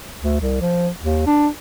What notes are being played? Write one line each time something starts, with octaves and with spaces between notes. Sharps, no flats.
D2
C2
F3
D#2
D4